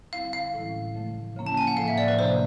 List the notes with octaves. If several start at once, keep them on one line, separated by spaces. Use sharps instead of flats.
D3 G3 C4 E4 F5
F5
A2 E3 G#3 C#4 E4
C#3 F3 A3
C#3 F3 A#3 C#4 E4
A5
G#5
F#5
A2 F3 A#3 F5
E5
D5
B4
C3 F3 A#3 D4 C5